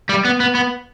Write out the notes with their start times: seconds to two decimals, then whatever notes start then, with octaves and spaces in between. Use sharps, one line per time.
0.09 G3
0.25 B3
0.40 B3
0.55 B3